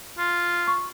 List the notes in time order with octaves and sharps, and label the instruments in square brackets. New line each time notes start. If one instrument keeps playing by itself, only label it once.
[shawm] F4
[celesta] C#6